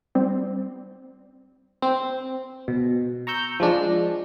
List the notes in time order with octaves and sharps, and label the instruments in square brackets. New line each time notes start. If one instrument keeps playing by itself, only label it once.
[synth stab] G3 C4
[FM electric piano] C4
B2
A#5 C#6 E6 G6
F3 G#3 D4